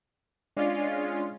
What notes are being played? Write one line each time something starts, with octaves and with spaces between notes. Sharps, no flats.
G#3 C#4 D4 F4 D5